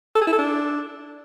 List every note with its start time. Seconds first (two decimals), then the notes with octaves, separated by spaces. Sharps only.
0.16 A4
0.21 G#4
0.27 E4
0.33 A4
0.38 D4